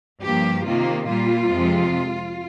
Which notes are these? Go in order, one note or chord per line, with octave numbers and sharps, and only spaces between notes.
G2 F3 A#3 G4
C3 D#3 A#3 F4
A#2 G3 A#3 F4
F2 C3 F3 G#3